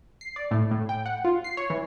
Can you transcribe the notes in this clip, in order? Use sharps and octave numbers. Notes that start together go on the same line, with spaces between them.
C7
D5
A2
A2
G5
F#5
F4
C7
C#5
E3